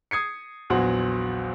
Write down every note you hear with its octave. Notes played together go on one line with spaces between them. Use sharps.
D#6 G#6 C7 C#7
A#1 E2 F#3 F#5 C6